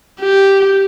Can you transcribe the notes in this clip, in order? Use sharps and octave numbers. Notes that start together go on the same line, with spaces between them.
G4